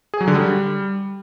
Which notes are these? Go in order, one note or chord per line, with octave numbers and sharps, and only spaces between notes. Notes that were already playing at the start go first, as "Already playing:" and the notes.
G#4
F#3
D3
G3